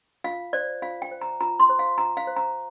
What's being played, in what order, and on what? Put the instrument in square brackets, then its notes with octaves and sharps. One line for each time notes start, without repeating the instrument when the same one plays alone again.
[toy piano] F4 F5
C5 D5
F4 F5
G5
C5
A#5
F4 A#5
C6
C5
F5
F4 A#5
F5
C5
A#5